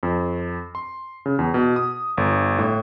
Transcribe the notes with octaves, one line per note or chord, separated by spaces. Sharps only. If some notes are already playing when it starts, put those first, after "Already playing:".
F2
C6
C#3
E2
B2
D#6
G1
A2